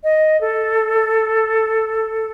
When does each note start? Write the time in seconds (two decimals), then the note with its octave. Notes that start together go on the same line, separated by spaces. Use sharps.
0.04 D#5
0.41 A4